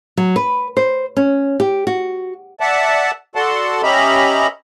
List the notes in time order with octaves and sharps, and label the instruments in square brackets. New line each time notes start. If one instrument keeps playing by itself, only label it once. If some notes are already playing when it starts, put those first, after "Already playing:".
[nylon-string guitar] F#3
B4
C5
C#4
G4
F#4
[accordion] D5 E5 F#5 A5
F#4 A4 D5 F#5 A5 C6
C#4 G4 D#5 E5 A#5 B5